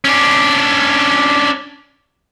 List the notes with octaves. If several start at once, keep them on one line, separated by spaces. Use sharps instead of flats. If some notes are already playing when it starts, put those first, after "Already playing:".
C#4 D4